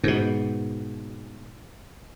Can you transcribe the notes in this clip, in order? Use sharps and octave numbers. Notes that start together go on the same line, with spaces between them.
G#2 B2